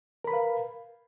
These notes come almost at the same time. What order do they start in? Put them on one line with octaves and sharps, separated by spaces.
A#4 B5 B4 F5